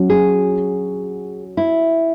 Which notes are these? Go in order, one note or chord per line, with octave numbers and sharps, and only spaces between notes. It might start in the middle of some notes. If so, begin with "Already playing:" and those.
Already playing: F#3 C#4 F#4
G#4
E4